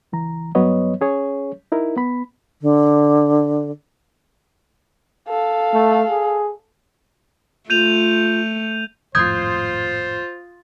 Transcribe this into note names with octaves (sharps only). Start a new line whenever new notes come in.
C#2 E3 A#5
G2 F#3 B3 B4 C#5 D#5
C#4 G#4 C#5
D#4 E4 A#4
B3 B5
D3
A4 F5
A3
G#4
A3 F4 G6 D#7 F7
G#1 F2 A2 F4 C5 D#6 G6 G#6